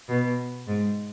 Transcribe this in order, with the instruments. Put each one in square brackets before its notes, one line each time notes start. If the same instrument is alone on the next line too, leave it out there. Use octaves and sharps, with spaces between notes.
[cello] B2
G#2